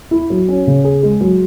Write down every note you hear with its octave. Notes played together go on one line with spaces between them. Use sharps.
E4
F#3
C#4
C#3
G#4
G#3
F#3